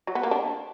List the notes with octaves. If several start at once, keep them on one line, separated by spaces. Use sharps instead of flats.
F#3
B3
A#3
D4